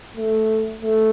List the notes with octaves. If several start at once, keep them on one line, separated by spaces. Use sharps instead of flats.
A3
A3